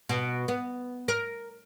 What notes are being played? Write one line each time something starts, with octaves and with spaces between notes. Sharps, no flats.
B2
B3
A#4